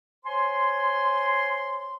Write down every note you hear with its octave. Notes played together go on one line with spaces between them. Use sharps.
C5 C#5 G#5 C6